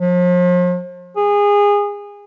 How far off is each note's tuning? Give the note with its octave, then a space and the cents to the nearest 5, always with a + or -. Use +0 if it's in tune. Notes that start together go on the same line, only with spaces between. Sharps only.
F3 +40
G#4 -25